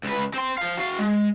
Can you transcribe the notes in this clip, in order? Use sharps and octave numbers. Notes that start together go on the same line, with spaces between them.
C#2 B4
C4 C6
F3 F5
F#4 F5
G#3